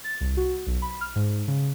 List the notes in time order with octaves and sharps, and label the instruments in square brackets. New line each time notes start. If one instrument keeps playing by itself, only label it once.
[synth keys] A6
C2
F#4
B1
B5
F6
G#2
C#3